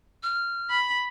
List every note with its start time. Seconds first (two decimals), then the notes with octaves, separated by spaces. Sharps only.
0.23 F6
0.70 B5